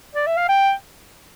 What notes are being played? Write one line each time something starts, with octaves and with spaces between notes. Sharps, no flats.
D5
E5
F5
G5